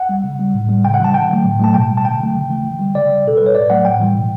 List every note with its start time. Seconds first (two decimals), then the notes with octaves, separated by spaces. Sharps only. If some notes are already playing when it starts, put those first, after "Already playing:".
Already playing: F#5
0.09 G3
0.24 C#3
0.39 G3
0.54 A2
0.69 G3
0.84 C#3 G5
0.94 F#5
1.00 E3 G3 A5
1.14 D3 G5
1.30 F#3 A3
1.44 A2
1.60 F#3 A3 A5
1.74 B2 G5
1.89 G3
1.97 A5
2.05 D3 G5
2.20 F#3 A3
2.35 C#3
2.49 E3 A3
2.65 D3
2.80 G3
2.95 C#3 D5
3.11 G3
3.25 B2 A4
3.37 G3 B4
3.46 C#5
3.55 A2 D5
3.70 F#3 A3 F#5
3.85 A2 G5
4.00 E3 G3
4.16 B2